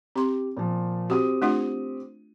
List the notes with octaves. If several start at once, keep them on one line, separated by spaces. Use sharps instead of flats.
C4 G4 C6
A#2 F3
C4 F#4 G4 D#6
A3 D4 F4